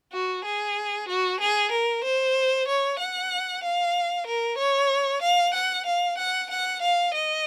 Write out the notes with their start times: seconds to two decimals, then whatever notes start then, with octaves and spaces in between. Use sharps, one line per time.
0.13 F#4
0.45 G#4
1.08 F#4
1.40 G#4
1.72 A#4
2.04 C5
2.68 C#5
2.99 F#5
3.63 F5
4.27 A#4
4.58 C#5
5.22 F5
5.54 F#5
5.86 F5
6.18 F#5
6.50 F#5
6.82 F5
7.14 D#5